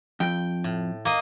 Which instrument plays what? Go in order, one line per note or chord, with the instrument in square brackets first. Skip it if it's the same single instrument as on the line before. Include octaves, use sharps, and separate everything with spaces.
[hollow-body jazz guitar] F2 [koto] G5
[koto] A2
A#3 D#5